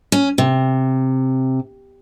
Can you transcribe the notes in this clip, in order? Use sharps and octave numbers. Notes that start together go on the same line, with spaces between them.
C#4
C3